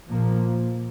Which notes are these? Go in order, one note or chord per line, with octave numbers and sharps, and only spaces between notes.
A#2 F3 A#3